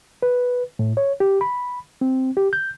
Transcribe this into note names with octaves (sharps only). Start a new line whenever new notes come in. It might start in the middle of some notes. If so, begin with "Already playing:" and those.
B4
A2
C#5
G4
B5
C4
G4
G6